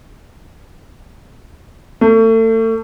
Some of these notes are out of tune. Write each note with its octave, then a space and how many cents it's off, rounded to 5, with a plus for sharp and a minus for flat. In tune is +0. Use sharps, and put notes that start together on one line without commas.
A3 +35